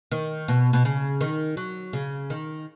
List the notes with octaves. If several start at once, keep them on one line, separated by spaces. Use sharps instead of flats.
D#3
B2
B2
C#3
D#3
F#3
C#3
D#3